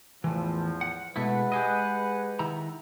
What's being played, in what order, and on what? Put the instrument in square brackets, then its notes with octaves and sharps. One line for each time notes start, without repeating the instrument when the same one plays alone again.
[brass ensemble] E2 F3 [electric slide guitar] A2 E3
[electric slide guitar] F#5
[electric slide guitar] B2 A3 E4 [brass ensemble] G#3 B4 F#5
[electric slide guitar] G4 G#4 D#5
D#3 E4 A#5